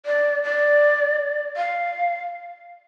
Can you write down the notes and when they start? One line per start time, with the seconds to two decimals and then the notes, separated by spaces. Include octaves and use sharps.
0.06 D5
0.43 D5
1.57 F5